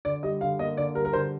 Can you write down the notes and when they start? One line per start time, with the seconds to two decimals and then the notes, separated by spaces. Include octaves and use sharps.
0.05 D3 D5
0.23 G3 D#5
0.41 D3 F5
0.59 A#3 D#5
0.77 D3 D5
0.95 G3 A#4
1.05 A#4
1.13 D3 C5